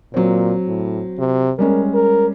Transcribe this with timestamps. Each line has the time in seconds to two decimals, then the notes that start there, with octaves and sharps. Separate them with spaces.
0.14 A#2 F#3 C4
0.67 A2
1.19 C3
1.59 G3 G#3 C#4 A#4
1.94 A#4